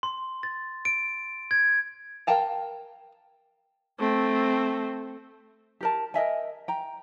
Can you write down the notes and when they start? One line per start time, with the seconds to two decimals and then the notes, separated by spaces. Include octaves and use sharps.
0.03 C6
0.43 A6
0.85 D7
1.51 G#6
2.27 A#4 F5 G5 A5 A#5
3.99 A3 C4
5.81 G4 A#4 A5
6.14 A#4 D#5 E5 G#5
6.68 G5 A#5